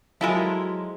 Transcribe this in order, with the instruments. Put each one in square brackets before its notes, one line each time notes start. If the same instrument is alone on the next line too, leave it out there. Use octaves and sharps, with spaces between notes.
[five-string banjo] F3 G#3 [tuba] F#3 [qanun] E4 A4 A#4